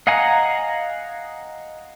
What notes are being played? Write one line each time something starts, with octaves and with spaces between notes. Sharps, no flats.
D#5 F5 F#5 G#5 A#5